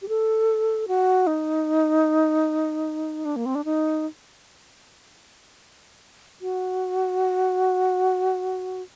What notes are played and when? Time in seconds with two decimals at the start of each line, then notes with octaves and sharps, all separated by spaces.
0.02 G4
0.08 A4
0.88 F#4
1.27 D#4
3.25 D4
3.36 A#3
3.46 C4
3.55 D4
3.65 D#4
6.41 F#4